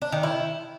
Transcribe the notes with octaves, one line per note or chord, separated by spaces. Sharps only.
D4
D#3
E4